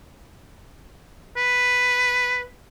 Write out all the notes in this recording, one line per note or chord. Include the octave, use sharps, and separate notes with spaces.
B4